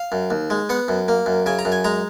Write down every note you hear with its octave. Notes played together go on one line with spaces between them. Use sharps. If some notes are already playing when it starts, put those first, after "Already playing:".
Already playing: F5
F#2
D#2
G#3
B3 F#5
F#2
A#3
F#2
C#3 G#5
A#5
F#2
G#5
G#3 A#5